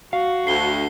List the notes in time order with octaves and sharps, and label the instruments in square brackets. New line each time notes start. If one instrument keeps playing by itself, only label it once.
[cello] F#4 [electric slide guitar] F5
[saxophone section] D2 [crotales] C7 G7